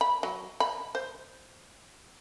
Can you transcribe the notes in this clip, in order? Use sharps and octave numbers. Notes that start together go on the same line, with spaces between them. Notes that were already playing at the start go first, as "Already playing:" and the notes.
B5
F#3
B5
C5